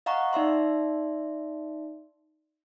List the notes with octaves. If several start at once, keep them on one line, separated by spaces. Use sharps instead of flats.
D#5 F5 F#5 A#5 C#6
D#4 D5 E5 C6